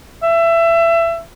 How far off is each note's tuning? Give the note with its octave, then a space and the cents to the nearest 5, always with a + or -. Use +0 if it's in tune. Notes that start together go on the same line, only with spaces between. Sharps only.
E5 +25